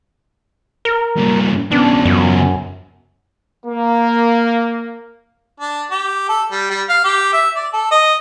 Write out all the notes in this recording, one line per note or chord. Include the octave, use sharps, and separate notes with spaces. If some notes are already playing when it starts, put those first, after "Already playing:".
A#4
G2 A#3
C#3 B3 D4
F#2
A#3
D4
G4
A4
G3
G3
F5
G4
E5
D5
A4
D#5